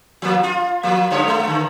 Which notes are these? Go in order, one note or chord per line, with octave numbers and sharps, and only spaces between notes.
F3 A#3
F4
F3 A#3
G2 D3 C#5
G#3
D3